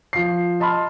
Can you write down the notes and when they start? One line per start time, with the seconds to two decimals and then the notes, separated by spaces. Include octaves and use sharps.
0.13 F3 C7
0.60 D#5 A5 B5 C6 F6